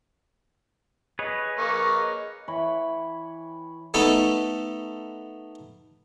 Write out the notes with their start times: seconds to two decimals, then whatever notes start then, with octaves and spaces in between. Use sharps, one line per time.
1.19 G#4 B4 C#5 D#5
1.58 A#3 C#6
2.48 E3 C#5 G5 B5
3.94 A3 B3 D#4 A4